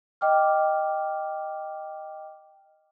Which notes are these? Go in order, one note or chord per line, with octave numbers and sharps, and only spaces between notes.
D#5 G5 D6 F6